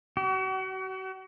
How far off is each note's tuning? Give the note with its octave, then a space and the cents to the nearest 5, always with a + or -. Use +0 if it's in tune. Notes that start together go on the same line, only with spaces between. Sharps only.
F#4 +40